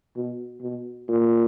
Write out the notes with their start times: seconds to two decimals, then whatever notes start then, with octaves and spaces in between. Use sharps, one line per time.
0.16 B2
0.62 B2
1.09 A#2